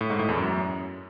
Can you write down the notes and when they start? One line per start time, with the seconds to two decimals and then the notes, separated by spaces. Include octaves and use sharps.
0.01 A2
0.10 G#2
0.19 A2
0.29 E2
0.38 F#2